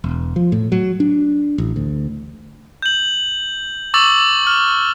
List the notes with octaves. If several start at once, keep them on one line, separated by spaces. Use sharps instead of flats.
E1
F3
A2
F#3
D4
A1
D2
G6 F#7
C#6 D6 E6 A6 F#7
F6